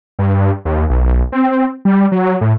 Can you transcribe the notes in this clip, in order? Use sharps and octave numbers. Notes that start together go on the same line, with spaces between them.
G2
D#2
B1
C4
G3
F#3
A2